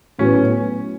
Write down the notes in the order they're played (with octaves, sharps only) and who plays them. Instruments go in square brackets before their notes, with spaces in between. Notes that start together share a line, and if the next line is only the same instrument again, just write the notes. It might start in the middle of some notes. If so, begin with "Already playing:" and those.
[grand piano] A2 F#3 B3 [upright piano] C#4